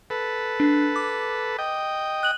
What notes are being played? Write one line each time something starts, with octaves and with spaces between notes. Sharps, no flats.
A4 B4
D4
D6
D#5 G5
F#6 F#7